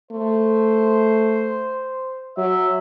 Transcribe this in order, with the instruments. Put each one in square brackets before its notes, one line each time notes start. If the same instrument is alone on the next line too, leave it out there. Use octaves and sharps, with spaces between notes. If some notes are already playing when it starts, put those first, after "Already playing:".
[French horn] A3 [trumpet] C5
[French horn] F#3 [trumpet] E5